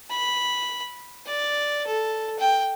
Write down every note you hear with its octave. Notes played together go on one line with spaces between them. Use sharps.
B5
D5
A4
G5